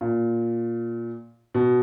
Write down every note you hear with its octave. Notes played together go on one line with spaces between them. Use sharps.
A#2
B2